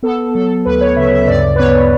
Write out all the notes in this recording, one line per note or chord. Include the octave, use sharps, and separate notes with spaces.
B3 A4
F#3 A4
D2 B4
B4
C#5
C#3 E5
E5
E5
G2 D5
B4
B3 C#5